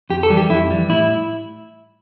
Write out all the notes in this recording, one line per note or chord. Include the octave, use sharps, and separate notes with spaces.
F2 G4
A4
E3 G3
G4
F2 E4
E3 G3
A2 E4